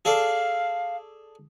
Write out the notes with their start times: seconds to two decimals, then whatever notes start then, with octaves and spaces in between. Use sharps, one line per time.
0.05 G#4 A4 D5 F5